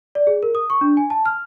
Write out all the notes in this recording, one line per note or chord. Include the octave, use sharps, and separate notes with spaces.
D5
G#4
A#4
D#6
C#6
D4
G#5
A5
F6